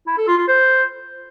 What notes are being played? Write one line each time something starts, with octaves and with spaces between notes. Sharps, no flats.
E4
A4
F4
F4
C5